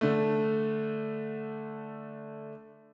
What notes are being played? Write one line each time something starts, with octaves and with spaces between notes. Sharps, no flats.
D3 A3